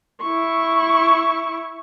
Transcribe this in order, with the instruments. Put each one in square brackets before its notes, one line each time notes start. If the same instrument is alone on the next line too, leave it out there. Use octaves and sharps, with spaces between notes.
[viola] E4 C#6